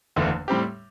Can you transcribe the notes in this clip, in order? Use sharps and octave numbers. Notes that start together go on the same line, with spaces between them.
F#1 E2 D3 A3 D4
A2 G3 C4 G4